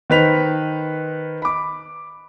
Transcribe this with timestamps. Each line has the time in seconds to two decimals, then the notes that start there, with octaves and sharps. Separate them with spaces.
0.10 D#3 D#4 B4 C5 B6 F7
1.42 B5 D6